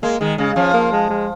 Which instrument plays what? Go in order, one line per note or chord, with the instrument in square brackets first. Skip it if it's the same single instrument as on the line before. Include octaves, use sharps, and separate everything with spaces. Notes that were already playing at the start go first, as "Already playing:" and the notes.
[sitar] G#3 [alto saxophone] A#3
[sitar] D#3 [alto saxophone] G#3
[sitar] C#3 [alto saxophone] G#3
[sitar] F3 [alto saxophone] C#4
[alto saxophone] A#3
G#3
G#3